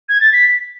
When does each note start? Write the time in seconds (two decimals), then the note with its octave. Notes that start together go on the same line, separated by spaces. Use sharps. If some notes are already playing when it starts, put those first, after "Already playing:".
0.09 G#6
0.21 A6
0.33 B6